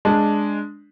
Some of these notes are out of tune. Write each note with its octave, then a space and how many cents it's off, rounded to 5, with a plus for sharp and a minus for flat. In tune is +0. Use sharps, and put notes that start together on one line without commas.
G#3 +0 D4 +0